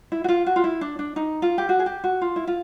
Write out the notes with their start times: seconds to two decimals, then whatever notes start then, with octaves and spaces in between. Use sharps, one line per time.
0.12 E4
0.24 F#4
0.29 F4
0.46 F#4
0.56 F4
0.64 E4
0.81 D4
0.99 D4
1.16 D#4
1.42 F4
1.58 G4
1.69 F#4
1.79 G#4
1.86 G4
2.04 F#4
2.21 F4
2.36 E4
2.47 F4